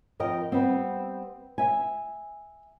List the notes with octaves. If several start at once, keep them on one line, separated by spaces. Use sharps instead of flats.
F2 A#4 D#5 G5
G3 B3 C4
E5 G#5